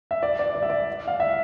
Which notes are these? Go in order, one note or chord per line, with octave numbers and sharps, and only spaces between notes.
E5
D5
D5
D5
E5
D5
F5
E5